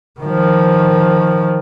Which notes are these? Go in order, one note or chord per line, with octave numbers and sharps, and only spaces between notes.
D#3 F3